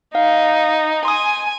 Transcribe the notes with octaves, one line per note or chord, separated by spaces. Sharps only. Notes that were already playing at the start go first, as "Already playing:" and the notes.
D#4 F5
G#5 C6 D#6